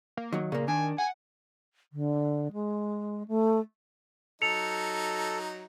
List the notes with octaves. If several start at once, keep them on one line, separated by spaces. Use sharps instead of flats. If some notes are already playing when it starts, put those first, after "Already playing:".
A#3
D#3 F#3
A#2 C#3 A#3
D#3 D4 G#5
F#5 G#5
D3
G#3
A3
F#3 D#4 A4 C#7 F7